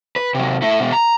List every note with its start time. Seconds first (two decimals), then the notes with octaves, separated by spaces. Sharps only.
0.16 B4
0.35 C3 F#3
0.62 A3 E4
0.80 B2 G#3
0.92 A#5